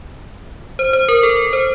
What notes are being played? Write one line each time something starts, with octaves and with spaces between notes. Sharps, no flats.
C5
C5
A#4
A4
C5